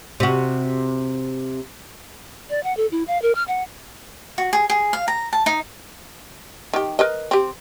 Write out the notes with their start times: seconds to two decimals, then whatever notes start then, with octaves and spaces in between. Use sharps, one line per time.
0.20 C3 F#4
2.50 D5
2.63 F#5
2.77 A4
2.91 E4
3.07 F5
3.22 A#4
3.35 F6
3.48 F#5
4.38 F#4
4.53 G#4
4.70 G#4
4.93 F5
5.08 A#5
5.33 A5
5.46 D#4
6.73 D#3 G4
6.99 A#4 B4 D#5
7.31 C4 G4